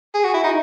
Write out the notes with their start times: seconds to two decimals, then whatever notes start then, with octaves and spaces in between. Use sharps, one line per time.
0.15 G#4
0.24 F#4
0.34 E4
0.44 D#4